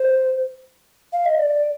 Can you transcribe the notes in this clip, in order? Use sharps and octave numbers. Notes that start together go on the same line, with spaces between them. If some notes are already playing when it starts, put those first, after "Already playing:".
Already playing: C5
F5
D#5
D5